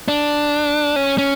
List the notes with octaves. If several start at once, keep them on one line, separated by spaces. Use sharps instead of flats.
D4
C#4
C#4